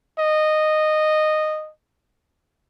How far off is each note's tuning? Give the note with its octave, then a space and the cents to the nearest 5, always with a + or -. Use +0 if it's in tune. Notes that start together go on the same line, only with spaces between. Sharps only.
D#5 -10